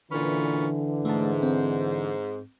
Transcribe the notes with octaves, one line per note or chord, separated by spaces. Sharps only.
A#2 D3 E3 C#4 B4
G#2 A3 A5
C4